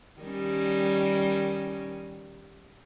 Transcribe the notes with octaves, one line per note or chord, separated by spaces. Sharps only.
D#3 G3 C#4